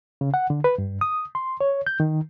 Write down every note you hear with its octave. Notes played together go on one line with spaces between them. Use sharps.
C#3
F#5
D3
B4
G2
D#6
C6
C#5
G6
D#3